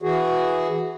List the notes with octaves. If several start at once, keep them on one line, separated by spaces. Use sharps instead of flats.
E3 F#4 G#4